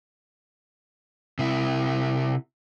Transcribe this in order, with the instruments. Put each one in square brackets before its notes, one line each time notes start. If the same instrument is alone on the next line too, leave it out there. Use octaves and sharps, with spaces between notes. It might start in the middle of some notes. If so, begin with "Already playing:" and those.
[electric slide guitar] C3 E4